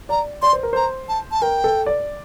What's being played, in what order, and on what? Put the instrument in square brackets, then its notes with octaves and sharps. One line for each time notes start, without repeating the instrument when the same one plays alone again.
[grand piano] D5 [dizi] A#5
[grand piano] D5 [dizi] C6
[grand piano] C5
A#4
[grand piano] C5 [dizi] A#5
[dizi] A5
A5
[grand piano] A#4 [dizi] G5
[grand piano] A4
D5